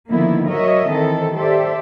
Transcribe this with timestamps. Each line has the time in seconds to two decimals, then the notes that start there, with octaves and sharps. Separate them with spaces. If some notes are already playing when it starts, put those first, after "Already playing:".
0.11 D3 D#3 F3 A#3 B3 E4
0.50 F#3 F#4 A#4 C#5 D#5 E5
0.91 D#3 E3 C4 A4
1.37 G4 A4 C5 D5 E5